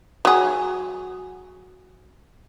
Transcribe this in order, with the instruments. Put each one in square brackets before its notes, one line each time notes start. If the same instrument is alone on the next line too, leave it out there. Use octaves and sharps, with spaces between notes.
[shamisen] F#3 G#4